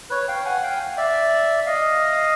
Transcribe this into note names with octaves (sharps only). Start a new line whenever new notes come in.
B4 C#5
F5 G5
F#5 G#5
F5 G5
D5 E5
D#5 F5